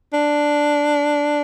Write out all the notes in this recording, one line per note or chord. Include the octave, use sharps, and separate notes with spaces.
D4